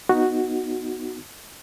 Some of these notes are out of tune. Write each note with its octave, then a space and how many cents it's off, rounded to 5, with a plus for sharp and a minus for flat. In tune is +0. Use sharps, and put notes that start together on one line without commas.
B3 +0 D#4 +0 F#4 +0